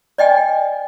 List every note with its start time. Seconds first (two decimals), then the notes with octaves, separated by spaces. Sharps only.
0.18 D5 D#5 G5 G#5